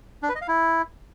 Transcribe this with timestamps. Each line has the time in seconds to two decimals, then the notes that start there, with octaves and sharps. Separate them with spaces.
0.23 D4
0.29 B4
0.35 D#5
0.42 F5
0.48 E4